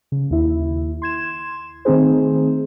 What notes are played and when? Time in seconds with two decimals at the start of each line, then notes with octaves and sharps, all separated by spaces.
0.12 C#3
0.31 D#2 E4
1.02 C6 G#6 E7
1.85 D#3 A3 C4 D#4 G#4 C5